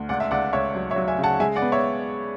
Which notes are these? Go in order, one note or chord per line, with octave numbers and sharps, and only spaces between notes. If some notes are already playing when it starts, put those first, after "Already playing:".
Already playing: D2
C#2 D5 F#5
E5
C#2 D5 F#5
C#2 C#5 E5
F#3
C#5 E5
F#3
E5 G#5
C#3
F#5 A5
G#3 E5 G#5
D5 F#5
B3
C#5 E5